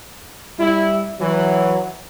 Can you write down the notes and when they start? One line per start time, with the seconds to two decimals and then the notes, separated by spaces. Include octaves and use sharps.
0.60 G3 E4
1.20 E3 F#3